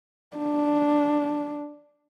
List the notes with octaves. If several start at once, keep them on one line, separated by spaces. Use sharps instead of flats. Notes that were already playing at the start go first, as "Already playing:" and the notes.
D4